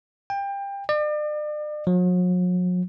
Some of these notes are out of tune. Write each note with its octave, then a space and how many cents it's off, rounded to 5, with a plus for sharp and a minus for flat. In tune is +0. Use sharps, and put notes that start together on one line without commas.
G5 +25
D5 +40
F#3 -45